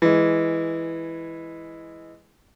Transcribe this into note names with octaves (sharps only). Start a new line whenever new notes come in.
E3 G#3